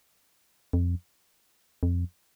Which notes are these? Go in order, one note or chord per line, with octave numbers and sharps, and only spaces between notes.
F2
F2